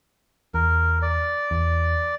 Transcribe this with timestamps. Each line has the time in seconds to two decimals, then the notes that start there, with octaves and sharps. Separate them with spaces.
0.54 E2 A#4
1.02 D5
1.51 E2